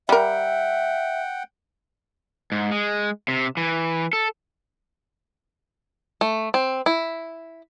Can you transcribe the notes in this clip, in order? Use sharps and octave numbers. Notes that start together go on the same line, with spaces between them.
G3 A#4 E5 F#5 G5
G#2
G#3
C3
E3
A4
A3
C4
E4